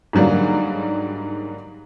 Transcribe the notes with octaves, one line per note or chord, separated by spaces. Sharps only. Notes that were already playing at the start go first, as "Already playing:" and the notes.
G#2 D3 F#3 G3 A#3